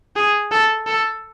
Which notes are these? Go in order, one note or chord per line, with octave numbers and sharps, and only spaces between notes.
G#4
A4
A4